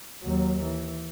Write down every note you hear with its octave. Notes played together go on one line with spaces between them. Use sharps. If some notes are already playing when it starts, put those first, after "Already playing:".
D#2 F#3
E3